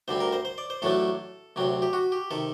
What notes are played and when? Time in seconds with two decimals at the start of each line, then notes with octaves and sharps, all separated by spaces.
0.08 D2 D3 G3 C4 C5
0.20 A#4
0.32 C5
0.45 C5
0.58 D5
0.70 C5
0.82 A1 A2 F#3 A3 D4 A4
1.56 D2 C3 F#3 C4
1.82 G4
1.93 F#4
2.12 G4
2.31 C3 D#3 A4